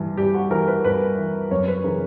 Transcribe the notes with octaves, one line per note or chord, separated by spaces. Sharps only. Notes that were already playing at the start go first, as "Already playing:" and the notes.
Already playing: G2 E3
G2 G4
F#4
E3 A#4
B4
G2 B4
E3
F#2 C#5
B4
C#3 E3 A#4